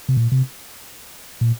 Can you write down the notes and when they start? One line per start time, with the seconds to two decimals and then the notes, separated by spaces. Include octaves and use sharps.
0.09 C3
0.17 A#2
0.32 C3
1.41 A#2